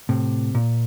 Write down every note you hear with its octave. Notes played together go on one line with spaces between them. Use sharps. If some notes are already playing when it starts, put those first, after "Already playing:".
A2 C3
A#2